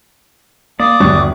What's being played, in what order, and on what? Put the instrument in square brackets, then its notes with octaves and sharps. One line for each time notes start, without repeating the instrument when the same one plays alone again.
[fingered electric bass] A#3 [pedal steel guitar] D5 [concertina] D6 D#6
[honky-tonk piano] G1 F#3 C#6 [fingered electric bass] D#2 D4